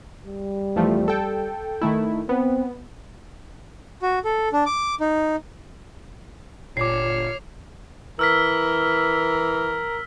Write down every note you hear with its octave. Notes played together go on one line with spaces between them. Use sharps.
G3
E2 F3 A3
A4 G5
D#3 A3 E4
B3 C4
F#4
A4
D4
D6
D#4
G1 A#2 C#5 D6 F6 C7
E3 A#4 E6 F6 B6